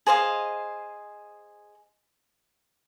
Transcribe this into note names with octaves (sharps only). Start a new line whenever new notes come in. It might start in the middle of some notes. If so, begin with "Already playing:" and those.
G#4 C5 D#5 F5